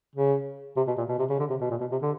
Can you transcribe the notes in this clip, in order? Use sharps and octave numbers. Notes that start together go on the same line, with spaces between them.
C#3
C3
B2
A#2
B2
C3
C#3
D3
C3
B2
A#2
B2
C3
D3